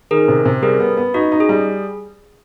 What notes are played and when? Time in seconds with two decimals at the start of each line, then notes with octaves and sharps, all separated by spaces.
0.11 D#3 G#4 A#4
0.28 C3
0.45 C3
0.62 G3 G#4 A#4
0.80 B3
0.97 B3
1.14 D#4 F#4
1.32 D#4
1.40 G#4
1.49 G3